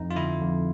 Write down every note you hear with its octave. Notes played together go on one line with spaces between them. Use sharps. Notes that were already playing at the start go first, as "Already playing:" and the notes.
Already playing: F2 D#4
F4
D3 E4
F2